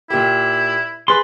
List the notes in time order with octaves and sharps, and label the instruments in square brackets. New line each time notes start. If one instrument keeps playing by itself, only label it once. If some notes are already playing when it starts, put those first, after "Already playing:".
[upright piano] A#2 G4 [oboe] E4
[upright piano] G#4 A6 [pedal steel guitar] B4 C6